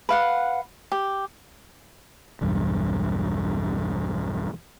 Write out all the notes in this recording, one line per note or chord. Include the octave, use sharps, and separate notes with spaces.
B4 F5 F#5
G4
B1 E2 G2